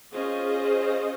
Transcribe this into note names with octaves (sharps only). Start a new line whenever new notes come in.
C#4 F4 G#4 C5 D#5